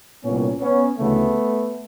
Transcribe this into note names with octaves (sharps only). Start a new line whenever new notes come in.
C2 A#2 B3 C#4
B3 C#4
D2 C#3 E3 A3 B3